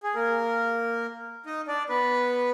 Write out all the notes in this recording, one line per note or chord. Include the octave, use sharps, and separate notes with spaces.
G#4
A#3 A#4
D#4 D#5
D4 D5
B3 B4